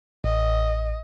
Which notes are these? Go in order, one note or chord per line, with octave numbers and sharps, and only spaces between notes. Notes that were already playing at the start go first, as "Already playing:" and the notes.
A1 D#5